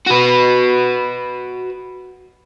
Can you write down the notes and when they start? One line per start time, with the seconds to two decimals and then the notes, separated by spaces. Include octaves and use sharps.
0.07 F#4 B4